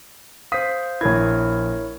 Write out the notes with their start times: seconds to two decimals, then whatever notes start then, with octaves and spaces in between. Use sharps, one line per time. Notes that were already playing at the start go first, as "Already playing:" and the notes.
0.52 C5 F5 D#6 B6
1.01 A#1 E4 A#4 C#5 G#6